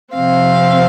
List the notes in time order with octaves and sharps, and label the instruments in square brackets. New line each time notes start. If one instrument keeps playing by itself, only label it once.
[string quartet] C3 F3 C4 F5